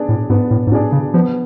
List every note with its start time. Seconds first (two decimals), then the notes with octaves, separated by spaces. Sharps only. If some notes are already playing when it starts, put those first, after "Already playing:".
Already playing: B3 D4 G#4 D5
0.09 A2
0.30 G#2 B3
0.51 A2
0.67 G#2
0.72 A2 D4 G#4 D5
0.92 C#3
1.14 F3 B3